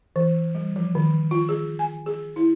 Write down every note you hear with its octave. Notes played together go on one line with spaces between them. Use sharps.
E3
G3
F3
D#3
F4
G#4
G#5
G#4
E4